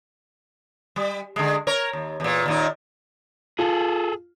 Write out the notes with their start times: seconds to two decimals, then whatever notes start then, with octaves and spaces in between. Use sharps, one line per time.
0.96 G3
1.36 D3 G#3
1.67 A#4 C#5
1.93 D#2
2.20 E2 A#2
2.46 D#2 A#2 D#4
3.59 F4 G#4 A4